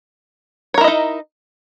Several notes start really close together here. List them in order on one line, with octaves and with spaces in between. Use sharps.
C#5 A#4 E4 D#5 D#4